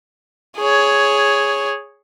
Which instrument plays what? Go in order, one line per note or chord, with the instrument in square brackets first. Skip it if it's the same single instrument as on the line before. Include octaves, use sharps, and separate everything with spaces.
[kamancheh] G#4 C#5